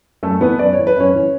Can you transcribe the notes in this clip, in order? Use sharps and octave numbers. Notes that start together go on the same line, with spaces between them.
F#2 A3 A4
E3 B3 B4
F#2 D5
C#5
E3
B4
F#2 C#4 C#5
E3